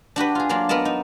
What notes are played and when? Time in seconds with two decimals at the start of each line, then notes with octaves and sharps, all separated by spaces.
0.16 D4 F#4 G4 B4
0.35 F4 G#4
0.49 F#3 A#3 D4 F4
0.69 B3 A#4 D5 D#5 A5
0.85 D#4